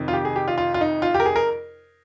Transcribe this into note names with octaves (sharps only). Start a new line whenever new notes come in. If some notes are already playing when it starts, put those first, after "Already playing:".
Already playing: F2 C3 D#3
F4
G4
G#4
G4
F4
F4
F4
D#4
F4
G4
A#4
G#4
A#4